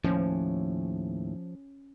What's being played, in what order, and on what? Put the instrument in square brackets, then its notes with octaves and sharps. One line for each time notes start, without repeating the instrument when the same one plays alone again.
[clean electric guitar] D#2 A2 [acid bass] F3 [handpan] C#4